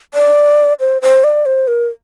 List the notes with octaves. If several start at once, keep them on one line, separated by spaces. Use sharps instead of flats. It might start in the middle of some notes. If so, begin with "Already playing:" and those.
D5
C5
C5
D5
C5
A#4